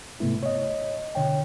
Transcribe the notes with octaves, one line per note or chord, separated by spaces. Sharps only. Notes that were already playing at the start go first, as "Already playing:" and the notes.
G#2 C3 A3 B3 E4
C#5 D#5
B2 D3 C#5 G5